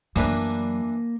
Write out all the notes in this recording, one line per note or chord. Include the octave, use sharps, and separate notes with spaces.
F#2 E3 F#3 A#3 D4 B4